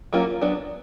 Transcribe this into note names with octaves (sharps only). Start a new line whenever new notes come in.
F#3 A#3 C#4 F4
F#3 B3 D4